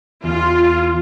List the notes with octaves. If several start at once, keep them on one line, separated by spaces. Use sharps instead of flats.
E2 F4